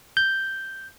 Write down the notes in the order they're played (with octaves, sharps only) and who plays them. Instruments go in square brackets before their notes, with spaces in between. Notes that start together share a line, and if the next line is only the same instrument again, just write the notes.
[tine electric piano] G6